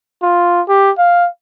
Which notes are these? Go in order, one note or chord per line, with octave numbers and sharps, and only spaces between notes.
F4
G4
F5